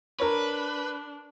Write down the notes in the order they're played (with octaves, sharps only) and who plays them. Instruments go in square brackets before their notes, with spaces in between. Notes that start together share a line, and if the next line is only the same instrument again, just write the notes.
[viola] D4 [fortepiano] A#4 C#5 [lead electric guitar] B4